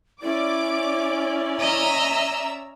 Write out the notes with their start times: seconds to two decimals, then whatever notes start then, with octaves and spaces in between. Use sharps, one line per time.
0.22 C#4 E4 D5 D6
1.59 D#5 E5 A#5 E6